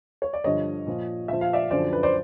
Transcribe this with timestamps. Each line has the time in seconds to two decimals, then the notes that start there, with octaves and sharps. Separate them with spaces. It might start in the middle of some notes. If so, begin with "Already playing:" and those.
0.22 C#5
0.33 D5
0.44 G2 D3 F3 C#5 D#5
0.87 A#2 F3
1.28 A#2 F3 E5
1.41 F5
1.53 D5 E5
1.70 F#2 D3 F3 C5 D5
1.93 B4
2.03 C5 D5